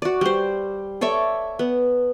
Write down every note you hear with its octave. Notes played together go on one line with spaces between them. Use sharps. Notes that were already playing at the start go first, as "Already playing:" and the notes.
F#4 D5
G3 C5
A4 C#5 D5 E5
B3